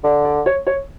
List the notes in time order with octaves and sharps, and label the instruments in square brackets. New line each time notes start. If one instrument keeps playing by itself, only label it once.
[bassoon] D3 [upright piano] D5
[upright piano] D5
C#5
C#5